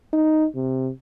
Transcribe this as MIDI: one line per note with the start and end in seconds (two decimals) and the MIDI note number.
0.13 0.46 63
0.55 0.90 48